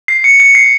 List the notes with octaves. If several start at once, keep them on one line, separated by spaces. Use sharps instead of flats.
C7
C#7
C#7
C7